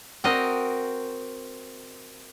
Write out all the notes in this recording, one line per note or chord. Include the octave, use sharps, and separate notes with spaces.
C4 F#4 A#4 D#5